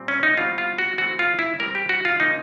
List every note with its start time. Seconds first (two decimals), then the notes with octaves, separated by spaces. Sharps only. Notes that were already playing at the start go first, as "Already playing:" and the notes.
Already playing: A#2 G3 C4
0.08 C#4
0.23 D#4
0.37 B2 G3 C4 F4
0.58 F4
0.78 F#4
0.98 E3 A3 C4 F#4
1.19 F4
1.39 E4
1.59 E3 G3 C4 A#4
1.75 G4
1.89 F#4
2.05 F4
2.20 C#3 F3 A#3 D#4